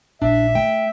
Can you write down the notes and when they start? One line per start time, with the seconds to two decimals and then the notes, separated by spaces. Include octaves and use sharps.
0.22 A#1 D4 E5
0.55 A3 G5